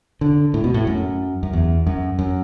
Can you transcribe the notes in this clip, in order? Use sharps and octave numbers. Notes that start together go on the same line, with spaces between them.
D3
A2
B2
A2
F#2
F#2
E2
F#2
F#2